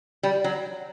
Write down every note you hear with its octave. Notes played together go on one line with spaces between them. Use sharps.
G3
F#3